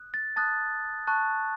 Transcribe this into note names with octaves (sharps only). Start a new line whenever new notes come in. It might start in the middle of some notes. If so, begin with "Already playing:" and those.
Already playing: D#6 F#6
A6
A5 D#6 F#6 A6
A5 C#6 F#6